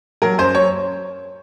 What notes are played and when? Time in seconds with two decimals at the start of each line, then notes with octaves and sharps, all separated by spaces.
0.22 F#3 A#4
0.38 F#2 C5
0.55 C#5